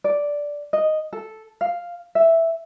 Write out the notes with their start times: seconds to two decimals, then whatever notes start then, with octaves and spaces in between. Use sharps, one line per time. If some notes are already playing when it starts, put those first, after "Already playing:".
0.04 D5
0.73 D#5
1.13 A4
1.61 F5
2.15 E5